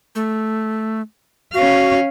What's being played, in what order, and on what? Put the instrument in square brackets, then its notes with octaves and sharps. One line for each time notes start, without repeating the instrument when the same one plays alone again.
[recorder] A3
[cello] C#4 F5 [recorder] F#4